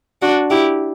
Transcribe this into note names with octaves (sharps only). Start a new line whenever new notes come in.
D4 F#4
E4 G4